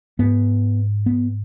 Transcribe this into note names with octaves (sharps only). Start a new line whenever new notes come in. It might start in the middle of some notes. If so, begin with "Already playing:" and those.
G#2 B3
B3